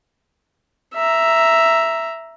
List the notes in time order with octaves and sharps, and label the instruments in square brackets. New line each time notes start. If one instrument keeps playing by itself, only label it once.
[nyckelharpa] E5 A#5